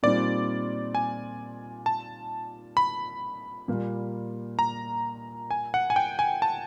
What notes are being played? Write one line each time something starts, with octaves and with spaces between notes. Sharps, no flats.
A#2 G3 C4 D#4 D5
G#5
A5
B5
A#2 G3 A#3
A#5
G#5
F#5
G#5
G5
G#5
A5